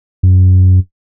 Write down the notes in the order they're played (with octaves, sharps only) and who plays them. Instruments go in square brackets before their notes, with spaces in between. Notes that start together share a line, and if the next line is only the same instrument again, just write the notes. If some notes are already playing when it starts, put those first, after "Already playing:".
[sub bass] F#2